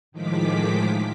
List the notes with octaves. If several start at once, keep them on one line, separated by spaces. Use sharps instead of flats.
A2 D#3 F3 G#3 D6 B6